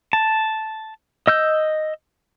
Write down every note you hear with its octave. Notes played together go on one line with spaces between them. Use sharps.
A5
D#5 E6 G6